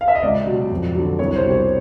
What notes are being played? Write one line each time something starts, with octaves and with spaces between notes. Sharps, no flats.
F5
E5
D#5
C#2 D5
B2 F#3
F2
D3 F#3
C2 C#5
C5
B2 G3
C#5